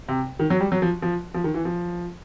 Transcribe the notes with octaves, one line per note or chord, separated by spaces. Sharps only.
C3
D#3
F#3
G3
F#3
F3
F3
F3
D#3
E3
F3